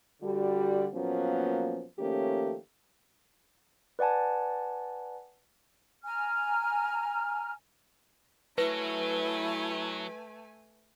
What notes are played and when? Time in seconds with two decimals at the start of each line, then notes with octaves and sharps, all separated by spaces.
0.22 D3 G3 F#4
0.93 A#2 F3 F#3 A#3 B3 C#4
1.99 D#3 F3 A3 A#3 C#4 G4
3.99 B4 D5 F#5 G#5 A5
6.04 G#5 A#5 F6
8.58 F#3 A3 E4 B4 G#5